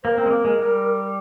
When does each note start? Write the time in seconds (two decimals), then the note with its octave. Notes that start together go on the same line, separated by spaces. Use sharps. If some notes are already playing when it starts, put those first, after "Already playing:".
0.03 A#3 A#4 C5
0.18 C4
0.26 G#3
0.31 A#3
0.45 G#3
0.59 G3